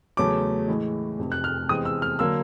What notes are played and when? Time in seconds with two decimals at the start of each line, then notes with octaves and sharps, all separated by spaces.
0.17 E2 C#3 F#3 A3 C#4 D6
0.68 A2 E3 G#3
1.19 F1 F2 C3
1.32 F#6
1.44 F6
1.69 E2 C3 E3 G#3 C4 D#6
1.85 E6
2.02 F6
2.19 D3 F#3 A#3 E6